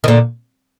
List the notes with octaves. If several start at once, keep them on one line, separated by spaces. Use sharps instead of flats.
D#3
A#2 D3